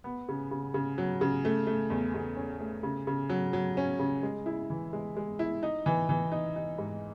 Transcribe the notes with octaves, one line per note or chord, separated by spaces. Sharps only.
B3
C#3
C#3
C#3
F#3
C#3
A3
A3
E2
E2
C#4
A3
C#3
C#3
F#3
F#3
C#4
C#3
G#3
E4
E3
G#3
G#3
E4
D#4
E3
E3
D#4
D#4
G#2